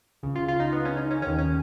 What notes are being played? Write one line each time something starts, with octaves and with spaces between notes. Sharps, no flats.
C#2 C#3
F4
F4
D#4
B3
C#4
D#4
C#4
D#2 D#3 C#4
C#4